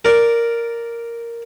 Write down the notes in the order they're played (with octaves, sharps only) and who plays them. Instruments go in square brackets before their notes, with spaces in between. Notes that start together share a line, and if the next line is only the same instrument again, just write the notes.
[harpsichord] A#4 D5